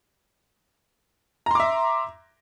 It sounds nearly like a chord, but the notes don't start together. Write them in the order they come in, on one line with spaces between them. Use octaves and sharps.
A#5 C6 D6 E5